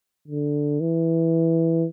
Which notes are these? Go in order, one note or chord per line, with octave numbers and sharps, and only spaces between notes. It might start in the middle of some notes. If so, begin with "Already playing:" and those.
D3
E3